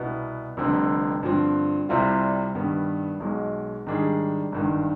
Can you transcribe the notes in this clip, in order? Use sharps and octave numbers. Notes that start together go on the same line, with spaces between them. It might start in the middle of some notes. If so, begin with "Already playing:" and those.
Already playing: C2 B2 B3
F1 F2 D3 G3 C4
G2 D3 F3 C4
C2 C3 G3 C4 F4
G2 D#3 G3 B3
B1 B2 G#3
G#2 D#3 G3 D4 G#4
G#1 G2 D#3